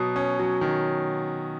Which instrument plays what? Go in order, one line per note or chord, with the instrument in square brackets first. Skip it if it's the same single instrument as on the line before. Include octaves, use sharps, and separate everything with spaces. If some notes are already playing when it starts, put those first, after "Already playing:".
Already playing: [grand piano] B2 F#3 D#6
C#4
F#3
D#3